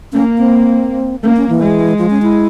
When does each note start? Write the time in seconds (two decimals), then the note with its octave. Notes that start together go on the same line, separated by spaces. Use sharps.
0.13 A#3 C#4
0.38 C4
1.24 A#3 C#4
1.36 C#4
1.49 E3
1.61 G#3
1.98 F3
2.10 C#4
2.22 E4